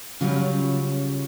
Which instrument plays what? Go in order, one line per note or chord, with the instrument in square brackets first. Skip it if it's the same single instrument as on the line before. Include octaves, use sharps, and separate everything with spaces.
[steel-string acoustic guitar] C#3 F#3 G3 C#4 F4 C#5